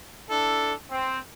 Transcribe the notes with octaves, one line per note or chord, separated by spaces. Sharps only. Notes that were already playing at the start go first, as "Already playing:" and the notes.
D4 E4 A4
C4